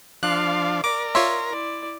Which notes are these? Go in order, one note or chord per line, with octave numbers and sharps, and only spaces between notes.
F3 D4 F5 C6 F#6
A#4 D5 D6
F4 C#5 E5 C6
E4 D5